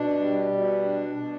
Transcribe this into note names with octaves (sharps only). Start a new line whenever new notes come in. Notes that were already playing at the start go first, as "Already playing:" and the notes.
Already playing: B2 D4
G3
B2
D4
B2